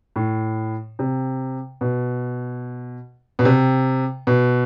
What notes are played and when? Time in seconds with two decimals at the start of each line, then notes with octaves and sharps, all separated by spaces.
0.16 A2
0.99 C3
1.81 B2
3.39 B2
3.45 C3
4.27 B2